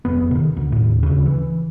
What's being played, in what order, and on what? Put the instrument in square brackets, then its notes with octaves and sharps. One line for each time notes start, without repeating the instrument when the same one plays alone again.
[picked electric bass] F1 B3
C3 D#3
D2
D#2 A2
D2 C#3
E3